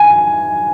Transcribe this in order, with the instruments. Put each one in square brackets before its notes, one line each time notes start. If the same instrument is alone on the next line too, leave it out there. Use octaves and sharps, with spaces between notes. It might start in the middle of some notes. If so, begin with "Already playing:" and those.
Already playing: [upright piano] G#5